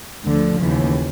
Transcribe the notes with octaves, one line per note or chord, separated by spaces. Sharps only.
D2 D3 F3
D#2 C#3 E3